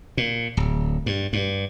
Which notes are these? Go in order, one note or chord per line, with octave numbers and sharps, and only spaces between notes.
A#2
D1
G2
G2